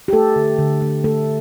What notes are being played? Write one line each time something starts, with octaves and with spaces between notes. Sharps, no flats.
G4
A3 A4
D3
D3
A3
A3 A4